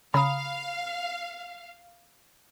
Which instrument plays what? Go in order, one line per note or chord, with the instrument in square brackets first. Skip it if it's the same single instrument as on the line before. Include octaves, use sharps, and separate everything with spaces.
[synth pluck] C#3 A#5 D#6 [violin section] F5 [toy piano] B5